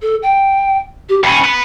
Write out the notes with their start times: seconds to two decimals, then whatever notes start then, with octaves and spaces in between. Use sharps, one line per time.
0.02 A4
0.23 G5
1.09 G4
1.24 D#2 C#4 B5
1.44 B3 B4